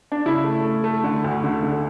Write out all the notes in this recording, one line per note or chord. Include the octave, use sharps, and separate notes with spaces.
D4
C#3 E4
A3
A3
A3
D3
D2
D3
D3